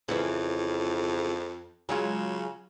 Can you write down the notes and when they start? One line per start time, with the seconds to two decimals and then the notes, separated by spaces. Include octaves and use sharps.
0.08 F2 C#3 E3 E4
1.89 C#3 F#3 G#3 F4